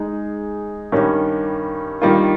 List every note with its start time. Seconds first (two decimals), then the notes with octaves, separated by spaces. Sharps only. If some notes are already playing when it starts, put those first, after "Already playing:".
Already playing: G#3 D#4 G#4
0.92 G2 D#3 G3 C#4
2.02 G2 D#3 G3 A#3 F4